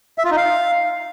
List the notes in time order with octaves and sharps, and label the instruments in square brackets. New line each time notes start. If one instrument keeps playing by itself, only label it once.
[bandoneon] E5
F4
D#4
F5